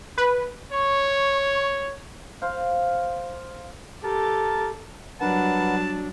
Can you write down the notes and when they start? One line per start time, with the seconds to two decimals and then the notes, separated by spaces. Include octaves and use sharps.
0.18 B4
0.72 C#5 C#6
2.42 C5 F5
4.03 G4 A4 A#4 A5
5.21 F#3 G3 D4 A#4 B4 F#5 A5